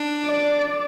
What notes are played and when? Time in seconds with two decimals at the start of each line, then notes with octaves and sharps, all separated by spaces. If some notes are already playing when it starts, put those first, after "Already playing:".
Already playing: D4
0.26 D5